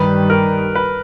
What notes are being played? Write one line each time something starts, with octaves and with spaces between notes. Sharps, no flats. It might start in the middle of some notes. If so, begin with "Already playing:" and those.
Already playing: G2 D#3 G3 B4
A#4
B4